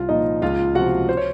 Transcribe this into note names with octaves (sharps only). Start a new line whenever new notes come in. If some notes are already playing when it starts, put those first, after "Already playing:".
Already playing: C2 F4
A#2 F3 D#4 D#5
C#2 F4 F5
C3 F3 F#4 F#5
C5
C#5